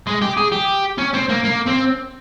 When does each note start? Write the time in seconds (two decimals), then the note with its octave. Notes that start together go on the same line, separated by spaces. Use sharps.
0.07 G#3
0.22 G4
0.37 G#4
0.52 G4
0.98 C#4
1.13 C4
1.28 A#3
1.43 A#3
1.66 C4